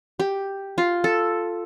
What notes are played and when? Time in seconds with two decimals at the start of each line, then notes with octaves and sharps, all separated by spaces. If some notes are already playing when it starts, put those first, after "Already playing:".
0.19 G4
0.78 F4
1.04 A4